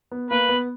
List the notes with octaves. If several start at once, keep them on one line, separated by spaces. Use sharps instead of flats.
B3
A#3 B4
B3